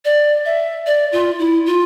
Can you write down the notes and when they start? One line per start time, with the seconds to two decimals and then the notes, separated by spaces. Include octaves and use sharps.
0.05 D5
0.45 E5
0.86 D5
1.12 F4
1.39 E4
1.66 F4